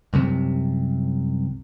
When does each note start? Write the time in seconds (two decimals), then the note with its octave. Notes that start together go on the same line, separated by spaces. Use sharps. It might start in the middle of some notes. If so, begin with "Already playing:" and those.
0.14 C2 F#2 C3